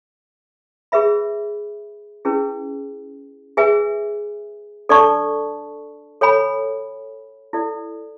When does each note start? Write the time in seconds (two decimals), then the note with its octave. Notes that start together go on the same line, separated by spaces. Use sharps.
0.92 G#4 B4 E5 B5
2.25 C#4 E4 G#4 B4
3.57 G#4 B4 E5 G#5
4.89 D4 A4 D5 A5 C#6
6.21 A4 C#5 G#5 B5
7.53 E4 A4 D5